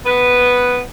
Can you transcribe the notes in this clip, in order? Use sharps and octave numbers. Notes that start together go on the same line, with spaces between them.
B3 B4